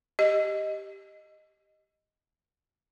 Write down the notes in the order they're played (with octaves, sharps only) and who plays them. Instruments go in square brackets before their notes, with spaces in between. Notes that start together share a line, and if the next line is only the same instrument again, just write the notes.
[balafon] G4 D#5